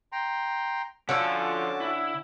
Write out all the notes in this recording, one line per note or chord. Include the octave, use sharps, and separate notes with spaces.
G5 A#5 C6
D3 F3 C#4 F#4 A4 F5 A5 D6
E4